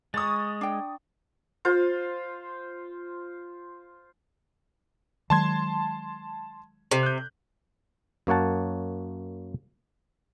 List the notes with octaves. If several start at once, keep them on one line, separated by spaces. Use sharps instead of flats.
G#3 A#5 C#6 D#6 A6
D4 G5
F4 C5
D#3 F#3 G#3 A5 C6 G#6
C3
F#6 G6
F#2 A#3 C#5 F#5 A5